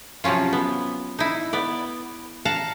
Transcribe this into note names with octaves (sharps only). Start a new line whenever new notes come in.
C3 F3 F#3 C#4 F4
B3
D#4 E4
B3 D5
F5 F#5 A5 A#5